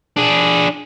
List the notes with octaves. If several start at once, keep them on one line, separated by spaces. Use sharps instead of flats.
D4 G#4